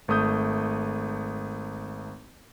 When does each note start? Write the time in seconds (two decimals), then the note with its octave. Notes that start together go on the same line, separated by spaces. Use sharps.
0.08 G#1 A3 D#6 G6